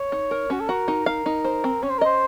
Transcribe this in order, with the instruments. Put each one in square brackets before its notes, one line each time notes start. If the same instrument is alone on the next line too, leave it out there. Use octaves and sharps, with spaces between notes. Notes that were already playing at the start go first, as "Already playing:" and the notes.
Already playing: [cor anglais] C#5
[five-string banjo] D#4
A#4
[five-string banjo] C#4 [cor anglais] F#4
[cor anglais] A4
[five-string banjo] F#4 [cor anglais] A#4
[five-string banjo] D#4
[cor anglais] A#4 [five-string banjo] F5
[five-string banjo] D#4
C5
C4
[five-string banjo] C#4 [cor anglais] C#5
[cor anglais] C5
A#4
[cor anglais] C5 [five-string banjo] D#5